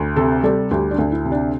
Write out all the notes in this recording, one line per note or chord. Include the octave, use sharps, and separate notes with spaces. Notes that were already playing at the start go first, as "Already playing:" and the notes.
Already playing: D2
C3 A4
G3 A4
D2 G4
D4
D2
E4
C3
D4